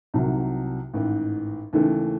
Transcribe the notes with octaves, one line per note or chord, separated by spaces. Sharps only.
C2 C3 D#3 F#3
A1 G#2 D#3
D#2 C#3 E3 A3